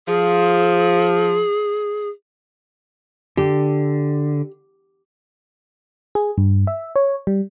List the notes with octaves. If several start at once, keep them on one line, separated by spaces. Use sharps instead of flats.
F3 G#4
D3 G4
G#4
G2
E5
C#5
G3